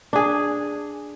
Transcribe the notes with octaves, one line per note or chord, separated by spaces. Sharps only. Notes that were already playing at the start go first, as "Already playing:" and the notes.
D4 G#4